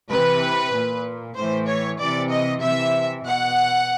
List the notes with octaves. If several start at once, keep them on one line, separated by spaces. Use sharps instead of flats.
C3 E3 B4
A#2
A2 E3 C5
C#5
C3 E3 D5
D#5
C3 E3 E5
B2 F#5